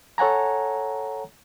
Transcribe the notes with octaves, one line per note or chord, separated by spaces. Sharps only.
A4 C#5 F#5 G#5 A#5